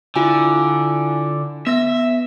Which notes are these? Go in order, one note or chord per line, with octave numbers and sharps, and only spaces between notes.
D3 E4 F4 G#5
B3 E5 A#6